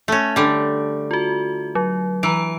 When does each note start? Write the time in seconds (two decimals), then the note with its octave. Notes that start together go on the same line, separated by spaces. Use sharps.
0.08 A3 C#4
0.36 D3 G3
1.11 F4 F#4
1.75 F#3
2.23 E3 A#5 E6 D7